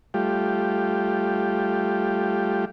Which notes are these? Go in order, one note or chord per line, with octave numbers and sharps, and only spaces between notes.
G3 A3 F4 G4